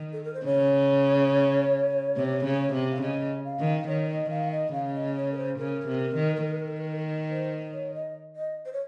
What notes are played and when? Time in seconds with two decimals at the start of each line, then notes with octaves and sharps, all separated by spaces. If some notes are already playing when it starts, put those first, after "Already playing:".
Already playing: D#3
0.13 A4
0.24 A#4
0.34 C5
0.45 C#3 C#5
2.16 C3
2.45 C#3
2.73 C3
2.91 F5
3.02 C#3 D#5
3.45 F5
3.59 D#3
3.87 D#3 C#5
4.08 D#5
4.30 D#3 F5
4.51 D#5
4.72 C#3 F5
4.95 D#5
5.16 C#5
5.32 A#4
5.37 C5
5.58 C#3 A#4
5.87 C3
6.15 D#3
6.44 D#3
7.30 C5
7.73 C#5
7.94 D#5
8.36 D#5
8.66 C5
8.73 C#5